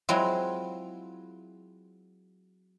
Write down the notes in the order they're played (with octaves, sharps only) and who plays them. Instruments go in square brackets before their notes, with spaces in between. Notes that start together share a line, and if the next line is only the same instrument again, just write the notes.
[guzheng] F#3 G#3 C4 E4 F4